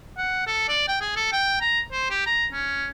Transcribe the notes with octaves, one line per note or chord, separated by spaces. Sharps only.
F#5
A4
D5
G5
G#4
A4
G5
A#5
C5
G4
A#5
C#4